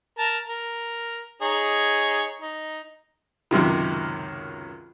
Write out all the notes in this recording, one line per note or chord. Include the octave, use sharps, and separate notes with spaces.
A#4 A5
A#4
D#4 G#4 C#5
D#4
C#2 F#2 C3 D#3